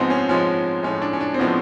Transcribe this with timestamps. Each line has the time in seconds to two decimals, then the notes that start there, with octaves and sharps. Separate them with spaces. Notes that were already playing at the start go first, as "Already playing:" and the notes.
Already playing: G#2 F3 G#3 B3 C4
0.10 C#4
0.29 G#2 F3 G#3 C#4
0.83 A2 F3 G#3 C#4
1.02 D4
1.13 C#4
1.21 D4
1.34 C4
1.39 A2 F3 G#3 B3